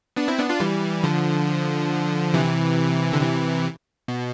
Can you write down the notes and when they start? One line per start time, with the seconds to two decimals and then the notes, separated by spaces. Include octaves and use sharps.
0.16 B3 D4
0.28 C4 E4
0.38 B3 D4
0.50 D4 F4
0.60 E3 G3
1.04 D3 F3
2.34 C3 E3
3.13 D3
3.21 C3 E3
4.08 B2